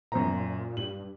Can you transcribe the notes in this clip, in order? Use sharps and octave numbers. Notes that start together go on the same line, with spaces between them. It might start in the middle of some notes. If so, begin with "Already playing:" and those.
F#2 A#2 C5 A#5
A#2
G2 F#7